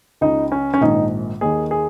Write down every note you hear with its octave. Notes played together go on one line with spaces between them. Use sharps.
C#2 C#3 D#4
C#4
C#4
A#1 G#2 D#3 D#4
D#2 D#3 G#4
G#4